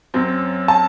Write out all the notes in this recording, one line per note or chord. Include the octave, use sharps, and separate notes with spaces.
F#2 F#3 C4
A5